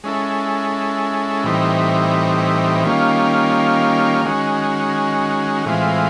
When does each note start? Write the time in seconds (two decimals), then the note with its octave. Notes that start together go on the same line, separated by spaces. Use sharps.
0.04 G#3 C#4 E4 A4
1.44 A2 E3 G3 C4 D#4
2.84 D#3 G3 A#3 C#4 F4
4.25 D#3 G#3 C#4 F#4
5.65 A2 E3 G#3 C4 F4